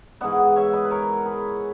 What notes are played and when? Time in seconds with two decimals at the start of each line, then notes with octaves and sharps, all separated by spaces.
0.21 G#2 E3 B3 D#5 F#5
0.56 C#5 E5
0.73 B4 D#5
0.85 B4
0.91 A#4 C#5
1.25 G#4 B4